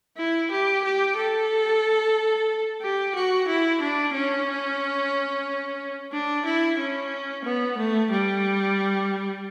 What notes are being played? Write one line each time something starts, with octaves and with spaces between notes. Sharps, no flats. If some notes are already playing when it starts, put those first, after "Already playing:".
E4
G4
G4
A4
G4
F#4
E4
D4
C#4
D4
E4
C#4
B3
A3
G3